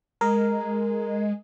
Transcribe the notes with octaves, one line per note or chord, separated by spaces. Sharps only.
G#3 A#4